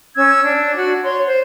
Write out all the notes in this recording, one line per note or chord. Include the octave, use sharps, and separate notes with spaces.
C#4 E6 G#6
D4
F#4
C#5 C6
C5